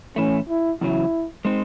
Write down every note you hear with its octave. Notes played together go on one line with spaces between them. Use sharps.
A2 E3 A3 C#4
E4
E2 C#3 F#3 E4
G#3 C4 D#4